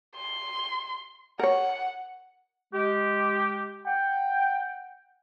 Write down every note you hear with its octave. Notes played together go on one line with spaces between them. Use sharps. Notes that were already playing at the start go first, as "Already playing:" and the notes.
C6
A#4 C#5 F#5
G#3 G4
F#5 G5